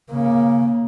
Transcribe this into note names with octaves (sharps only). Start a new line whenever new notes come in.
C#3 A#3